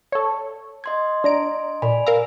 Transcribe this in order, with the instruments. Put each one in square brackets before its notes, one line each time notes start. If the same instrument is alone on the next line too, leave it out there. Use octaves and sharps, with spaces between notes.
[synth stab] A4 C#5
[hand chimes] D#5 C6 G#6
[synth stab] D4 A#5 D7
[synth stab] A#2 [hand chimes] D5 G#5 B5
[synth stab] A#4 F5 A#5 [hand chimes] E6